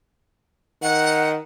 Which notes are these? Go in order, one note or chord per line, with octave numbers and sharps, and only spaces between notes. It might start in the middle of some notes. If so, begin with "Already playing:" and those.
D#3 F#5